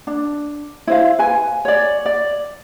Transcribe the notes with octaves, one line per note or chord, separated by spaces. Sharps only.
D4
E4 C5 F5
B4 G#5
C#5 D5
D5